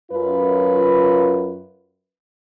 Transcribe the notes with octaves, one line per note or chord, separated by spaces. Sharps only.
F#2 F4 B4